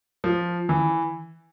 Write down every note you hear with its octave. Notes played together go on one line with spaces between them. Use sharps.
F3
E3